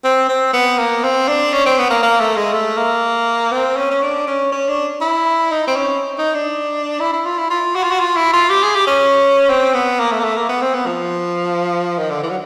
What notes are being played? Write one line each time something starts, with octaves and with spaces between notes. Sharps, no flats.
C4
C4
B3
A#3
C4
D4
C#4
C4
B3
A#3
A#3
A3
G#3
A3
A#3
C4
C#4
C#4
D4
C#4
C#4
D4
E4
D#4
C4
C#4
D#4
D4
E4
E4
F4
E4
F4
F#4
F4
F#4
F4
E4
F4
G4
G#4
G4
C#4
C4
B3
A#3
A3
A#3
A3
A#3
B3
C4
B3
F3
D#3
D3
E3
F#3